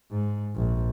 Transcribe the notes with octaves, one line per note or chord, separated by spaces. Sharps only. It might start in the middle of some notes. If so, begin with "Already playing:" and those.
G#2
A#1